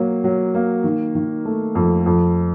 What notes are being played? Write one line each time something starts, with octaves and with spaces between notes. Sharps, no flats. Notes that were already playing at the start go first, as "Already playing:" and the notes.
Already playing: F#3 A#3
F#3
A#3
D#3
D#3
A3
F2
F2